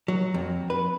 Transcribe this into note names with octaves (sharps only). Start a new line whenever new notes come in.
F#3
F2
B4